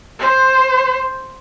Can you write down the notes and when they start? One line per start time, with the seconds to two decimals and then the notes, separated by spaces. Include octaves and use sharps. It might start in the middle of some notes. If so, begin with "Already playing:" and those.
0.19 C5